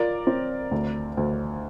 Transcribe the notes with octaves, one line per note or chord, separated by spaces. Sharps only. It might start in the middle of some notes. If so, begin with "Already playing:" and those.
Already playing: F4 A#4 D5
C4
D2
D2